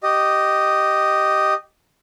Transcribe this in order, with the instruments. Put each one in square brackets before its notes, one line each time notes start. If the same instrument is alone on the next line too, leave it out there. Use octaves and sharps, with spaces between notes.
[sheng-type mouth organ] G4 D#5